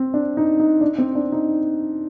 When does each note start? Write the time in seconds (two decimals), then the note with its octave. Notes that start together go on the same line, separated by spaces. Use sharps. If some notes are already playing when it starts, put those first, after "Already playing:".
Already playing: C4
0.14 D4
0.37 D#4
0.60 D#4
0.81 D4
0.98 C4
1.15 D4
1.32 D#4